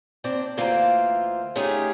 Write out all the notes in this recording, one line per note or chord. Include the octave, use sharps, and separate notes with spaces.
A#2 C4 D4 D5
D2 E3 A#3 F4 C5 G5
A3 C#4 D#4 F4 G4 G#4